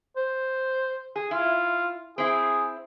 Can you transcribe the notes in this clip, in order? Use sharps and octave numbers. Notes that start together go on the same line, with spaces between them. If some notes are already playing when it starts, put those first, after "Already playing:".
C5
G#4
E4 F4
C4 E4 G#4